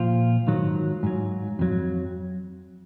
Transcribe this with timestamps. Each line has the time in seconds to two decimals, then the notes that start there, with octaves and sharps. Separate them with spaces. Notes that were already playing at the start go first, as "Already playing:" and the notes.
Already playing: A#2 F3 F4
0.47 G#2 D#3 F#3
1.03 G#2 F#3
1.59 F2 D#3 F#3